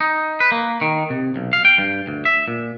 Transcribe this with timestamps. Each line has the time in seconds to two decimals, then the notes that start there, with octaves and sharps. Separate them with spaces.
0.01 D#4
0.40 B4
0.52 A#3
0.82 D#3
1.10 C3
1.36 B1
1.53 F5
1.65 G5
1.78 G2
2.07 D2
2.25 E5
2.48 A#2